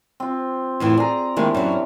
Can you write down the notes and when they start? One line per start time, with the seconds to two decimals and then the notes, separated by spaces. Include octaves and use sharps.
0.20 C4 F4
0.80 F2 A2 E3
0.97 G#4 D5 A#5
1.37 D#3 E3 G3 G#3 A#3 D4
1.55 F#2 F#3